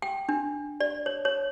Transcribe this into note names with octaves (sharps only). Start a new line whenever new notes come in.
G5
D4
D5
C#5
C#5